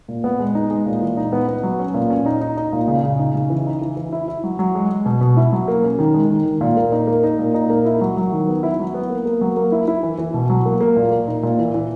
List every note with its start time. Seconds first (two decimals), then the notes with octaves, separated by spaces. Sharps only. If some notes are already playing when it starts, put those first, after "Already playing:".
0.08 A#2
0.24 B3
0.39 G#3
0.55 D#4
0.70 G#3
0.86 A#2
1.01 E3
1.17 D#4
1.33 B3
1.48 B3
1.63 F#3
1.79 C#4
1.94 A#2
2.10 C#4
2.26 D#4
2.41 D#4
2.57 D#4
2.73 A#2
2.88 C#3
3.03 C#3
3.19 D#4
3.35 C#3
3.50 E3
3.66 D#4
3.81 E3
3.97 E3
4.12 E4
4.28 E4
4.44 F#3
4.59 F#3
4.75 G#3
4.90 G#3
5.06 B2
5.21 B2
5.37 E4
5.52 F#3
5.68 A#3
5.83 C#4
5.99 D#3
6.14 G#3
6.30 D#3
6.45 D#3
6.61 A#2
6.77 A#3
6.92 D#4
7.07 A#3
7.23 D#4
7.39 A#2
7.54 D#4
7.70 A#3
7.85 E4
8.01 F#3
8.17 F#3
8.32 D#3
8.48 B3
8.63 E4
8.79 F#3
8.94 B3
9.10 A#3
9.25 A#3
9.41 F#3
9.57 A#3
9.72 E4
9.88 E4
10.03 E3
10.18 E3
10.34 B2
10.50 F#3
10.66 A#3
10.81 A#3
10.96 A#2
11.12 A#3
11.27 D#4
11.43 A#2
11.59 E3
11.74 E3